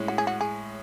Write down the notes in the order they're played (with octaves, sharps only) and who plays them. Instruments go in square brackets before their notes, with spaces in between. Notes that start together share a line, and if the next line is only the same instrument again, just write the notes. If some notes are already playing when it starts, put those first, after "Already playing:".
Already playing: [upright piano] A2 G#3 C#4
[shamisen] F#4
G#4
F#4
G#4